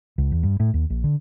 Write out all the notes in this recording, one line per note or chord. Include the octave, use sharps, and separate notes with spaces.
C#2
E2
G2
A2
D#2
A#1
D3